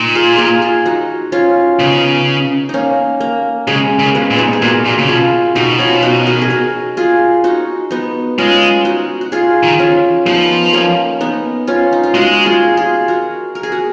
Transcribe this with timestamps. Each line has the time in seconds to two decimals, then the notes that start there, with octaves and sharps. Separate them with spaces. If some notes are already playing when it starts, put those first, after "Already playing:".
Already playing: A#2 D#4
0.15 F4 G#4
0.38 F4 G#4
0.62 F4 G#4
0.86 D#4 F#4
1.32 C#4 F4
1.79 C#3 B3 D#4
2.69 A#3 C#4 D#4
3.20 A#3
3.67 C#3 G#3
3.99 C#3
4.05 A#3
4.15 G#3 B3
4.31 A#2
4.38 B3 D#4
4.53 G#4
4.62 A#2 F#4 A#4
4.85 A#2
4.98 C#3
5.08 B2 F4 G#4
5.56 B2 D#4 F#4
5.79 C#4 F4
6.02 D#4 F#4
6.27 F#4 A#4
6.42 G#4
6.50 F#4 A#4
6.97 F4 G#4
7.44 D#4 F#4
7.91 B3 D#4
8.38 G#3 C#4 F4
8.85 D#4 F#4
9.21 F#4
9.32 F4 G#4
9.63 D#3
9.79 C#4 F4
10.26 F3 B3 D#4
10.73 A#3 C#4
11.21 B3 D#4
11.67 C#4 F4
11.93 D#4
12.03 F4
12.15 G#3 D#4 F#4
12.46 F4 G#4
12.77 F4 G#4
13.08 F#4 A#4
13.55 A#4
13.63 G#4
13.72 F#4